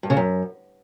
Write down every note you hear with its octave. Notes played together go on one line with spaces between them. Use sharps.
G2
C#3
F#2